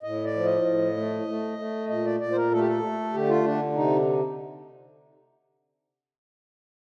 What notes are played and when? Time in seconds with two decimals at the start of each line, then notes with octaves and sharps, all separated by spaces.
0.03 A2 D#5
0.24 D5
0.34 F3
0.45 D#5
0.66 A2
0.97 A3
1.28 A3
1.58 A3
1.89 A#2 D#5
2.05 D5
2.20 A#2 D5
2.32 C5
2.36 A#4
2.51 A3 A4
2.59 G4
2.67 A4
2.82 A3
3.13 D3 G4
3.29 F4
3.44 D3 D4
3.75 C3 D#4